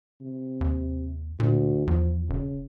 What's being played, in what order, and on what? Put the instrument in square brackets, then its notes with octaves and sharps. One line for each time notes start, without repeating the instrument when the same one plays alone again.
[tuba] C3
[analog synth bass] D#2
[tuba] D2 [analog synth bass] A#2
[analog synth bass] E2 [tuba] F3
[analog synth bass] E1 [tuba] C#3